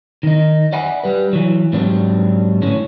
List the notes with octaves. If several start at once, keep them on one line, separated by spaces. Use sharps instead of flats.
D#3 D#4
D5 E5 F#5 G#5 B5
G3 B4
E3 F#3
G#2 F#3 G3 C4 D4
A2 D3 C#4